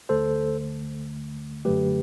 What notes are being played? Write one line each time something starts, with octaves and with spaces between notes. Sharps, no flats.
D2 D3 A3 A4 C5
F#2 D3 F#3 A3 G4 B4